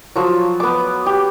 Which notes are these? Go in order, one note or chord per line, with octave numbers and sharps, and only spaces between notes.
F3 F#3
B3 D6
G4